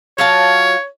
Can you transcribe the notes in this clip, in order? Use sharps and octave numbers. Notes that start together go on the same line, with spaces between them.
F#3 F4 C#5 A5